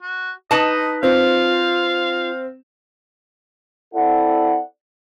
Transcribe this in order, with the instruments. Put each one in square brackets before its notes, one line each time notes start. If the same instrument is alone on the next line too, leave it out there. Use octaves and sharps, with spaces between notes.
[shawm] F#4
[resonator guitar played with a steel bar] D#4 B4 A5 [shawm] D#5
[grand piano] C4 [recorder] F4 [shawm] F5
[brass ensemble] C4 E4 A4 D5 F#5